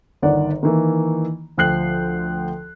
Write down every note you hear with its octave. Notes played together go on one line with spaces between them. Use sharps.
G1 D#3 D5 F#5
D#3 E3 A#3
D2 F3 G5 F#6 C7 F#7